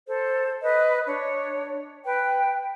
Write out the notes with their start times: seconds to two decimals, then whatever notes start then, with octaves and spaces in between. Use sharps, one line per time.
0.08 A4 C5
0.62 B4 D#5
1.07 D4 C#5
2.06 B4 G5